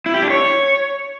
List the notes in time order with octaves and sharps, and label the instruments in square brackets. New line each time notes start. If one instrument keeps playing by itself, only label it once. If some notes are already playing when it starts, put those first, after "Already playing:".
[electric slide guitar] E4
G4
D4
C#5